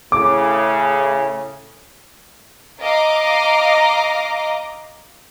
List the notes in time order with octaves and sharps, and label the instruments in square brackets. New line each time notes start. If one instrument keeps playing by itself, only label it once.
[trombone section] A2 C#3 [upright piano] D6
[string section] D#5 F5 A#5 D6